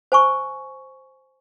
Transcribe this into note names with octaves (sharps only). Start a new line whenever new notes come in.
C5 G#5 C#6